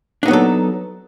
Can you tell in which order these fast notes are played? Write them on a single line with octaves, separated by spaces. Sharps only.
D4 D#4 B3 F#3 A4